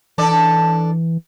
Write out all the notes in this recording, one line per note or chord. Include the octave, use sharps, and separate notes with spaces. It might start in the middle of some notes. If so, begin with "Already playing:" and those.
E3 D4 A4 D5